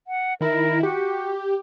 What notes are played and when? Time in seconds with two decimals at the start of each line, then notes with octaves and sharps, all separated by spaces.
0.07 F#5
0.41 D#3 E4 A#4
0.83 F#4 G4